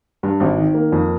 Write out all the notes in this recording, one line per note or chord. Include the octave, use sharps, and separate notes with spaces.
G2
G#1
D#3
A#3
F2